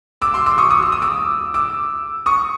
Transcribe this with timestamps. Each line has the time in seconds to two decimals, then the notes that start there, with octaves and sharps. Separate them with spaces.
0.22 D6 E6
0.34 C6 D6
0.46 D6 E6
0.58 C#6 D#6
0.71 C#6 D#6
0.82 E6
0.92 D#6
1.02 D6 E6
1.54 D6 E6
2.26 C#6 D#6